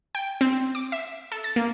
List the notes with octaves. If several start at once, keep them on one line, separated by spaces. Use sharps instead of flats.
G5
C4
D6
E5
A4
A6
A#3